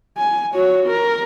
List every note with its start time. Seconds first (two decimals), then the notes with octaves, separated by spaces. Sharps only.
0.18 G#5
0.55 F#4 C#5
0.86 A#4